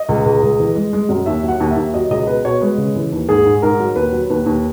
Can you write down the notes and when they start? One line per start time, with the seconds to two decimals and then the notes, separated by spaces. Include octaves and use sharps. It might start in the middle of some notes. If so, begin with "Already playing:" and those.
Already playing: D#5
0.09 C#2
0.26 C#2
0.43 C#2
0.60 E3
0.75 G#3
0.93 G#3
1.09 F#2
1.26 D#2 E5
1.43 F#3
1.48 F#5
1.60 D#2
1.71 E5
1.76 D#2
1.94 F#3 D#5
2.10 C#2 D#5
2.27 B2 B4
2.45 B2 C#5
2.61 G#3 B4
2.78 C#3
2.96 E3
3.12 D#2
3.29 G#2 G#4
3.46 G#2
3.62 G#2 A#4
3.79 F#3
3.96 D#2 B4
4.12 F#3
4.30 D#2 B4
4.46 D#2